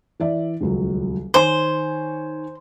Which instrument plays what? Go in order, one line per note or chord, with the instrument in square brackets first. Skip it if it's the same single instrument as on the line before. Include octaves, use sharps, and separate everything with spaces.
[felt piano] E3 D5 E5
D#1 C#2 F#3
[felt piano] D#3 C#5 G#5 [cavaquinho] C5